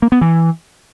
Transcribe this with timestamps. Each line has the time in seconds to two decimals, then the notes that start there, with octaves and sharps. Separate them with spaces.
0.02 A#3
0.12 B3
0.21 E3